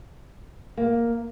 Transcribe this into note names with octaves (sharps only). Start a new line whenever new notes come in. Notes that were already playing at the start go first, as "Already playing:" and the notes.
A#3